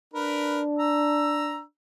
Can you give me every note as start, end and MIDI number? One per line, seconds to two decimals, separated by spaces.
0.14 1.64 62
0.14 0.61 70
0.14 0.61 71
0.79 1.61 82
0.79 1.61 88